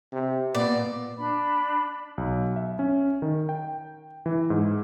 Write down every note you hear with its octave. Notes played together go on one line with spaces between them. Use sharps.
C3
A#2 B3 D5
D4 B5
B1
E5
C#4
D#3
G5
E3
G#2